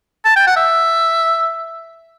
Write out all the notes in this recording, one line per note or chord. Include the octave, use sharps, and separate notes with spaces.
A5
G5
F#5
E5